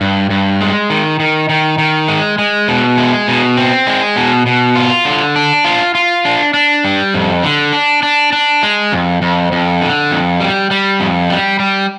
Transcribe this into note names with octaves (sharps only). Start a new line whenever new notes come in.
G2
G2
G#3
D#3
D#3
D#3
D#3
G#3
G#3
B2
G#3
B2
C4
G#3
B2
B2
F4
D3
D4
F4
F4
D4
D4
G3
F2
D3
D4
D4
D4
G#3
F2
F2
F2
D3
F2
G3
G3
F2
G3
G3